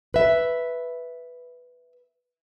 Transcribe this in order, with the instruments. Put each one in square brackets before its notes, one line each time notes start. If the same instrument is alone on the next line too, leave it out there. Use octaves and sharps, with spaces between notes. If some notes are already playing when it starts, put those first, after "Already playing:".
[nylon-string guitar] B4 E5